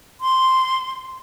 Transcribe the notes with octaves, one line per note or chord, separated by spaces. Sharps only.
C6